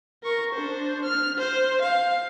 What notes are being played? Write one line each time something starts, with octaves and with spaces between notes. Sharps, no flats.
A#4 C#6
D4 C5
F6
C5
F5